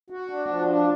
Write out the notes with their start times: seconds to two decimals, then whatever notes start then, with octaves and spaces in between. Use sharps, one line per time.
0.10 F#4
0.30 D4
0.49 F3
0.68 D4